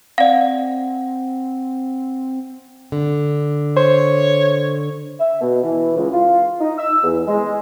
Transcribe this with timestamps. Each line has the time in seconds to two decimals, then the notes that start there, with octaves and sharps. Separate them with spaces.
0.18 C4 D5 F5 F#5
2.92 D3
3.77 C5 C#5
5.19 E5
5.40 B2
5.64 E3
5.96 C#2
6.13 F4
6.60 D#4
6.77 E6
7.04 E2
7.27 G#3